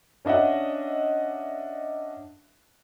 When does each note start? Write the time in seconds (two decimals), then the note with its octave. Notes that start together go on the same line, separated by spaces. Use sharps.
0.25 C#4 D4 D#5 E5 F#5